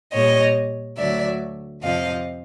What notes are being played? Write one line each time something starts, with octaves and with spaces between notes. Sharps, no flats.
A#2 G3 C#5 D#5
D2 D3 F#3 D5 E5
F2 C3 F3 D#5 F5